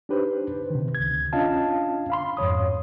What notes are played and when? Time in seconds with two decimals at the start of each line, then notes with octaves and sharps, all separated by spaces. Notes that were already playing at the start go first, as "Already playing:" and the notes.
0.09 D4 D#4 G4 B4 C5
0.70 C3 D#3
0.95 D2 G#6
1.33 C#4 D4 F4 D#5 F5 A5
2.10 F5 B5 C6
2.37 F2 G#2 C#5 D#6